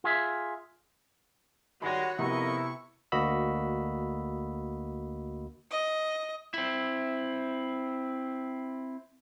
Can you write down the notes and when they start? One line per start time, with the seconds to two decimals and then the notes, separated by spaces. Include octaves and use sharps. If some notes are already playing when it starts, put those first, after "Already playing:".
0.04 F4 G#4 E5
1.82 D#3 G3 G#3 F#4 C#5 B5 A#6
2.19 F2 C3 B3 E4 A#4 D#5 C#6
3.12 D2 A#3 F#4 D#5 B5 E6
5.71 D#5
6.54 C4 E4